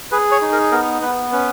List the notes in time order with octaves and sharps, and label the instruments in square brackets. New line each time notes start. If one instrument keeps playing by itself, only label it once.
[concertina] G#4 B4
C#5
D#4
A#4
B3 A#4
B3 B4
C#4 B4